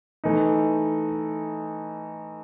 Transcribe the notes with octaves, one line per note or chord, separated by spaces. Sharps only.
E3 A3 D#4